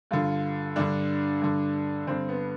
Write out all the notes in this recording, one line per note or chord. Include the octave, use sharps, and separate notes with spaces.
G2 D3 F4
G2 D3 D4
G2 D3
G2 D3 C4
B3